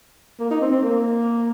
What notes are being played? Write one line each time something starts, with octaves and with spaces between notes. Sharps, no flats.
A#3
D#4
C4
C4
A#3